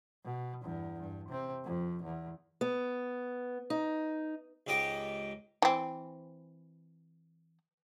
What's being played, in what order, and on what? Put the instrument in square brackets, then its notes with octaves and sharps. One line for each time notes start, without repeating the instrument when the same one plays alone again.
[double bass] B2
E2 G2
G2
C3 C4
F2
E2
[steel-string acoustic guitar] B3
D#4
[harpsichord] C#2 G#2 G4 D#5 G5
[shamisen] E3 C4